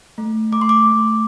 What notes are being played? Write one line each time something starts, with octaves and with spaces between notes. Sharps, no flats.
A3
A3 D6
C6
D6
A3